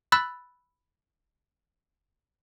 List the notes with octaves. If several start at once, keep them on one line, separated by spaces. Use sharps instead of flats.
B5 E6 F#6 A6